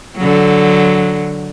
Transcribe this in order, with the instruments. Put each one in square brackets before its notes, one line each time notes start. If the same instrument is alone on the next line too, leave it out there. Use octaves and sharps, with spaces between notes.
[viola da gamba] D3 F#3